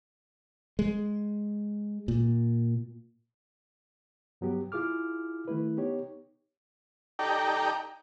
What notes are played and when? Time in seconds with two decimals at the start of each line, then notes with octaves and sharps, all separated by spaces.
0.79 G#3
2.08 A#2
4.41 G2 F#3 B3 G4
4.72 E4 F4 G#4 D6 F6
5.48 D#3 A3 E4 B4
5.77 B3 D#4 G4 C#5
7.19 D#4 G4 A4 D5 G5 A#5